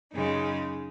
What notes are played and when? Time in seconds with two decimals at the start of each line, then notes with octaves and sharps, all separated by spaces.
0.13 F#2 C#3 G#3 D#4